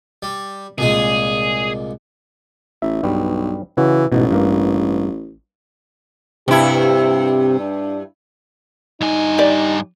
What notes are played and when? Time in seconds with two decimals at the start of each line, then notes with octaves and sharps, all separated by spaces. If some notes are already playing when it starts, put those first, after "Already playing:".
0.23 G3
0.78 C2 A#2 G#3 G#4
2.82 A1 E5
3.03 B1 G2 G3
3.77 C#3 E3 F#4
4.12 A1 G#2 B2
4.31 G2 A#3
6.48 G2 C3 E4 G4
7.60 D4
9.01 G2 D#4 G#5
9.38 G4 D5